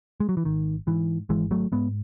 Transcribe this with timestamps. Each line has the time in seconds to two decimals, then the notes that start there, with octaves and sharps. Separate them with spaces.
0.20 G#3
0.29 F#3
0.37 E3
0.45 G#1 D#3
0.87 G#2 E3
1.29 G#1 E3 G#3
1.51 F#3 A3
1.72 G#2 G#3 B3